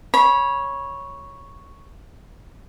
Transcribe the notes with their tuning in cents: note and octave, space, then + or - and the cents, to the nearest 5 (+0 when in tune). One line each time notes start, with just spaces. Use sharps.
C#5 +0 B5 -30